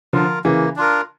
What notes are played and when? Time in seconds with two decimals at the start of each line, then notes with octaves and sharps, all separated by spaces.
0.13 D3 F3 F4 A#4
0.44 C#3 E3 A#3
0.76 D4 F4 A#4